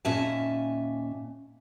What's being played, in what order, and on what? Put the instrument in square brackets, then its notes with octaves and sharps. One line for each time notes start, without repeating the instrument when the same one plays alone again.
[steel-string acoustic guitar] D#2 A#2 C#4 E5 G#5 A5